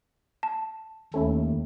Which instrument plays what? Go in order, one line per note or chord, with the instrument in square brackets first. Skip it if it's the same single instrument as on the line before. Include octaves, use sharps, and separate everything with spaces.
[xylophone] A5
[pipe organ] D#2 [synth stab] A3 C#4 E4